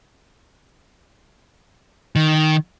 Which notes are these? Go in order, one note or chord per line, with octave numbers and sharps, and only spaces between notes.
D#3